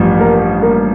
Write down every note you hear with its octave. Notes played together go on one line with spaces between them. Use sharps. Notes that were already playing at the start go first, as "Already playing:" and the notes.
Already playing: A1 G2 F3
A#3 A#4
A#3 A#4